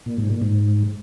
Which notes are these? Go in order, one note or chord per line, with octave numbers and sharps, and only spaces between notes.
A#2
G#2
A#2
G#2